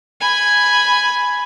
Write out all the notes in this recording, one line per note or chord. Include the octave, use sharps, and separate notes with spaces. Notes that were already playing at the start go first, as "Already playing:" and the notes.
G#5 B5